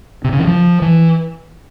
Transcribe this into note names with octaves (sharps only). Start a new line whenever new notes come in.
C3
C#3
E3
F3
E3